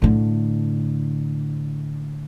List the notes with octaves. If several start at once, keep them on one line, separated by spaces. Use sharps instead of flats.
A2 D3